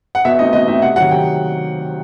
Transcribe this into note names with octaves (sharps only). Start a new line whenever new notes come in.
F#5
B2 E5
A3 C4 D#4 D#5
B2 D#5
A3 C4 D#4 E5
C3 F#5
D#3 F#3 F#5
C3 G5